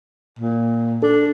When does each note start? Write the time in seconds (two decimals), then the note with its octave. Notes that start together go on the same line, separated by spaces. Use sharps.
0.39 A#2
1.03 D4 A4